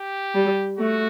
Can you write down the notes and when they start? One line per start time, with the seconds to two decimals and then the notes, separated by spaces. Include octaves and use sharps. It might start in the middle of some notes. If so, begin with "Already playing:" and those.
Already playing: G4
0.35 G3
0.78 A3 F#4